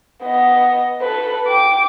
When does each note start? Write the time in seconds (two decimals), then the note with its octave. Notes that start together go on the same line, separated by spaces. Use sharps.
0.23 B3 D#5
1.01 A4 B4
1.48 G5 D6